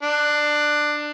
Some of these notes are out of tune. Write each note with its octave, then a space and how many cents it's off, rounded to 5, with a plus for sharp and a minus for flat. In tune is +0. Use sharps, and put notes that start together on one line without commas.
D4 +15